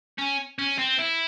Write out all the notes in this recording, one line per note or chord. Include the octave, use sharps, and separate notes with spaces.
C#4
C#4
C4
E4